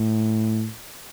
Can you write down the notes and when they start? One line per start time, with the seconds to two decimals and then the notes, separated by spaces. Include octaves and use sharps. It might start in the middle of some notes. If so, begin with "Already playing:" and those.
Already playing: A2